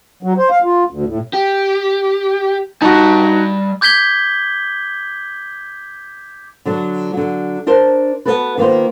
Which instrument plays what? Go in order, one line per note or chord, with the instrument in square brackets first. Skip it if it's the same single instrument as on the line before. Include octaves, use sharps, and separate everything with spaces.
[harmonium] F#3
C5
F5
F4
D2
A2
[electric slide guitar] G4
[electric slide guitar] G3 A5 [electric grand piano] D#4 F#4
[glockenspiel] D6 G6 G#6 B6 G7
[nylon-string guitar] D3 F#3 D4
D3 F#3
D4 A#4 C5 A5
B3 F#4 A4 B4
D#3 A#3 B3 F4 C5